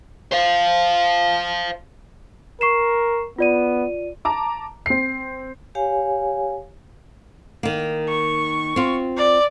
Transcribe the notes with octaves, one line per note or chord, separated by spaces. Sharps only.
C5 F5
A#4 C#6 C7 E7
B3 F4 D5 D#7
A5 A#5 D6
C4 C7
G4 C#5 F5 G#5
D#3 A#3
C#6
C4 F4
D5